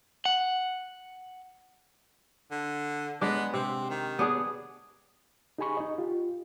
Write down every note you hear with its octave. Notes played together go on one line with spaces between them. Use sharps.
F#5
D3
G#3 B3 D4
C3 C4
D#3
B3 D4 G#4
D#4 G4 G#4 G#5 B5 C#6
D#4 D#5
F4 G4